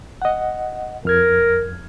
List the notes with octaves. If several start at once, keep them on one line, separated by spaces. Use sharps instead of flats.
D#5 F#5
F2 A#4 F6 G#6